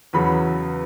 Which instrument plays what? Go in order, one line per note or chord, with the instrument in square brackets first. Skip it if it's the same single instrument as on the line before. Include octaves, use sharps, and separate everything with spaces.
[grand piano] E2 C#3 F#3 B5